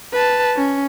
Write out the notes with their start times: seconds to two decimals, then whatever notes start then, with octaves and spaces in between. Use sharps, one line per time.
0.13 B4 A5
0.57 C#4